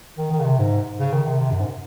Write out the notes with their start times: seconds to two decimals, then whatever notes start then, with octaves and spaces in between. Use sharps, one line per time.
0.18 D#3
0.32 D#3
0.40 C#3
0.45 C3
0.59 G#2
0.99 C#3
1.13 D#3
1.27 C3
1.40 C3
1.51 F#2
1.60 G#2